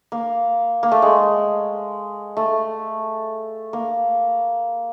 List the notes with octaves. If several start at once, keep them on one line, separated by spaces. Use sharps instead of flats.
A#3
A#3
A3
G#3
A3
A#3